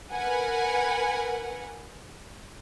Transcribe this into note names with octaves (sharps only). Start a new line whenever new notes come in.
A#4 B4 F#5 G#5